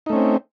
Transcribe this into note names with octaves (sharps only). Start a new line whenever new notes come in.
A3 C4 C#4 D#4